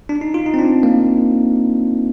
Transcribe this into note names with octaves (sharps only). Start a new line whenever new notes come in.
D4
D#4
F4
D#4
C4
D4
A#3